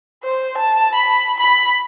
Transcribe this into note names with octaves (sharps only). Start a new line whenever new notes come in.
C5
A5
B5
B5